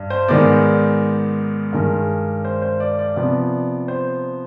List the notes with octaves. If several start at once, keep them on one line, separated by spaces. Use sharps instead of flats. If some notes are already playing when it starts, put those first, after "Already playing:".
Already playing: G2
C5
G#2 D#3 G#3 B3 D5
G2 D#3 G#3
C5
C5
D5
D5
C3 F3 B3 D5
C5